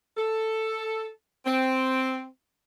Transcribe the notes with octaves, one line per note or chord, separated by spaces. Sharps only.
A4
C4